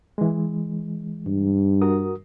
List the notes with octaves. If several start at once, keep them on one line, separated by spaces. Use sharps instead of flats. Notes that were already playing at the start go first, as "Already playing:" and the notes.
E3 G#3
G2
F#4 A#4 D#6